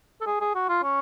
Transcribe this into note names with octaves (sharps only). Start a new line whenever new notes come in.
A4
G#4
G#4
F#4
F4
C#4